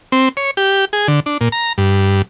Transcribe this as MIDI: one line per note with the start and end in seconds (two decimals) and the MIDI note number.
0.12 0.29 60
0.37 0.51 73
0.57 0.85 67
0.93 1.07 68
1.08 1.20 50
1.26 1.38 62
1.41 1.49 46
1.52 1.73 82
1.78 2.22 43